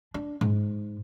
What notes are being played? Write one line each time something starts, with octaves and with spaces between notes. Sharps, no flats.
D4
G#2